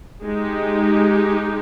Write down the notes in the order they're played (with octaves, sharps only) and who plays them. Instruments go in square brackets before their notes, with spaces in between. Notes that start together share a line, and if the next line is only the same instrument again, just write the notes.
[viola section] G#3 D#4 G4